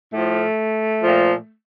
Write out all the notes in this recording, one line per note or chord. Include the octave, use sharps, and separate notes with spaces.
A2 F3 A3
A#2 F3